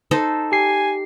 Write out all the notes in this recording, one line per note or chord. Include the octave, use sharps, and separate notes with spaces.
D#4 A4 C5
G4 G#5 C7